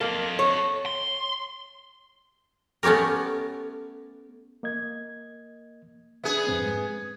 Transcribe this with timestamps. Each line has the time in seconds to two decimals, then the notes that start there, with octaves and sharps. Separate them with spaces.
0.01 A#3 A4 D#5
0.39 C#5
0.86 C6
2.83 A3 B3 C#4 G4 A#4
4.63 A#3 D#5 G#6
6.24 B3 D4 G#4 E5
6.47 F2 G#2 C4
6.66 G#3